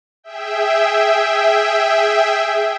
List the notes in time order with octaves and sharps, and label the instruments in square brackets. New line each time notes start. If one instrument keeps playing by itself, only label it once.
[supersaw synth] G#4 E5 G5